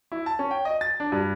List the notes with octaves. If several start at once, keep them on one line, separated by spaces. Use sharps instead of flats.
E4
A5
C#4
G5
D#5
A6
D4
G2